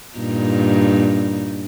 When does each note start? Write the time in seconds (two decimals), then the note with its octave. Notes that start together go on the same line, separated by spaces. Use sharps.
0.18 G2 A#2 D#4